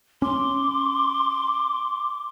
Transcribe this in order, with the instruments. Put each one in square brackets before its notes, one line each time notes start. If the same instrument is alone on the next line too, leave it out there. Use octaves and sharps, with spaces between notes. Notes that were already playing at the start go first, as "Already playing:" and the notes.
[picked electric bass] C#4 [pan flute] C6 [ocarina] D6